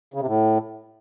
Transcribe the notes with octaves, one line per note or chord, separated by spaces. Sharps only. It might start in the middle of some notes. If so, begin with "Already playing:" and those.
C#3
C3
A2